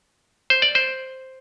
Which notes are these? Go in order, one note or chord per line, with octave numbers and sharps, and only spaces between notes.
C5
D5
C5